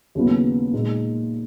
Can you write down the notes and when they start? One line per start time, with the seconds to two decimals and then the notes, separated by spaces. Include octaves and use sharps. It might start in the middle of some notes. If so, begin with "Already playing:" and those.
0.15 D#2 C#3 F#3 B3 E4
0.73 A#2 G#3 D#4